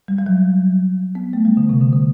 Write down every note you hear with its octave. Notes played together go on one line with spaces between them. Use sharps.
G3
G3
F#3
B3
A3
G3
D3
C3
D3
D3